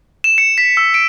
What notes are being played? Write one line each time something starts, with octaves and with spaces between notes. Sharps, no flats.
E7
C#7
B6
E6
D7